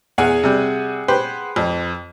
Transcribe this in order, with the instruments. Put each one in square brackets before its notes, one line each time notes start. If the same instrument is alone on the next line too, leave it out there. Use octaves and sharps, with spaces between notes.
[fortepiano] E2 [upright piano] G#4 F#5 G#5
[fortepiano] C3 G3
G4 B4 C5
[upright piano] F2